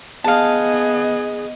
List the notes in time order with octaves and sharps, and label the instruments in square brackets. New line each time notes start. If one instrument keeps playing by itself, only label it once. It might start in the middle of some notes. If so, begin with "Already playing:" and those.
[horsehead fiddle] B3 D#5 [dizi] G#4 [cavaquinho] F5 A5